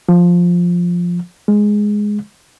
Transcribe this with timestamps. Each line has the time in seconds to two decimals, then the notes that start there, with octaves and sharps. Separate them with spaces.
0.09 F3
1.48 G#3